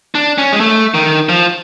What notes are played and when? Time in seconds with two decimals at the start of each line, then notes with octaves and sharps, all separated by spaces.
0.15 D4
0.38 C#4
0.53 G#3
0.60 A3
0.94 D#3
1.29 F3